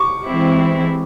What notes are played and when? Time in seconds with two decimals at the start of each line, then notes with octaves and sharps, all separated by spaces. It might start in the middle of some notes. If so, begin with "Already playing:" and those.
Already playing: C#6 D6
0.25 E3 G#3 C4 E4